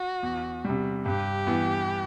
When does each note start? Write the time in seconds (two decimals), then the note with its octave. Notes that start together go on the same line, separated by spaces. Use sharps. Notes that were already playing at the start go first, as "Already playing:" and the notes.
Already playing: F#4
0.23 E2
0.65 C3 G3
1.06 G2 G4
1.47 E3 B3